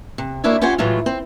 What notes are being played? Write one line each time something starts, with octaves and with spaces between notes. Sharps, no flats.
C3
D2 A#3 D4 E4 F#4 C#5
C#4 F4 G4 C5 F#5 G#5
A2 E3 F#3 G#3 A3 F4
C4